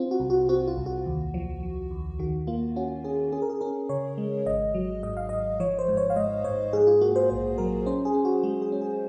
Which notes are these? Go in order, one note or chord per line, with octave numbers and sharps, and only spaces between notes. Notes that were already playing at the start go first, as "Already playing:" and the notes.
Already playing: C4 F4
F#4
C2
F#4
C4 F#4
F4
C2
F#4
D#2
F3
F3
D#2
D#3 F#4
A#3 F4
C#4 F#4
C#4 G#4
C#4 G#4
A#4
G#4
C#4 A#4
C#3 C#5
G#3
G#1 D#5
F#3
G#2 D#5
F5
G#1 D#5
F3 C#5
C5
G#2
C#5
F5
G#2 D#5
G#2 C#5
G#2 G#4
F4
A#3 F#4
C5
A#1 C5
F#3 A#4
C#4 C5
G#4
C#4
F#4
G#3 F#4
G#4
C#4
G#4